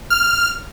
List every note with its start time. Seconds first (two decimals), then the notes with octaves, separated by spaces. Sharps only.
0.10 F6